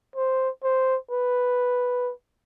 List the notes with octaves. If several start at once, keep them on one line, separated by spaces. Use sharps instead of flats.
C5
C5
B4